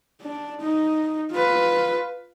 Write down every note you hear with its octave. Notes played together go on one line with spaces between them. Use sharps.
D4
D#4
F4 B4